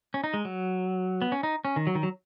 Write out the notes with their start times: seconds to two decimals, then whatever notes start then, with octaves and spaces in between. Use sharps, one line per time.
0.14 C#4
0.24 D#4
0.34 G#3
0.45 F#3
1.22 B3
1.32 C#4
1.43 D#4
1.65 C#4
1.76 D#3
1.87 F#3
1.95 D#3
2.03 F#3